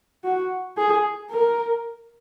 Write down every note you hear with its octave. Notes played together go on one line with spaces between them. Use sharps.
F#4
G#4
A#4